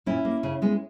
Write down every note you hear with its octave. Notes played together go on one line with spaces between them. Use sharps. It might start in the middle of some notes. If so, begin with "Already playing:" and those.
A#2 C#4 E4
A#3
C#3
G#3 B3